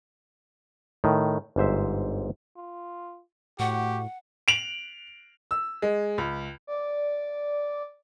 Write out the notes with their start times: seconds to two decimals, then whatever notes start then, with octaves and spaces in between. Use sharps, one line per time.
1.04 A2 D#3
1.56 G1 G#2 C5 E5
2.57 F4
3.59 A2 F#4 G4 F#5
4.48 D7 F7 F#7
5.51 E6
5.82 G#3
6.18 C#2
6.67 D5